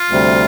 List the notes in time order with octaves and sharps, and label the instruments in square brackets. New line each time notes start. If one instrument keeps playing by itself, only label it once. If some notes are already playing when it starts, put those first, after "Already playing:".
Already playing: [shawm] F4
[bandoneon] D2 C3 G3